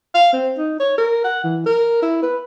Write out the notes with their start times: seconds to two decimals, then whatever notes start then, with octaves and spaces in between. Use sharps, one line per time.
0.14 F5
0.33 C4
0.57 D#4
0.80 C#5
0.98 A#4
1.24 F#5
1.44 E3
1.66 A#4
2.02 E4
2.23 B4